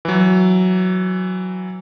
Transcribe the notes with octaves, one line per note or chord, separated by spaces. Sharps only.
E3 F#3